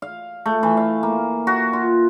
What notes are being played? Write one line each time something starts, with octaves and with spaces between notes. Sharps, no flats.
F5
A3
E3
F5
A#3
F#4
F4